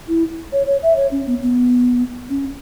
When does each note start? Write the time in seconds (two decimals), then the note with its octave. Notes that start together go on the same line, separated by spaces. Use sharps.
0.08 E4
0.52 C#5
0.67 C#5
0.83 E5
0.97 C#5
1.11 C#4
1.27 B3
1.42 B3
2.29 C#4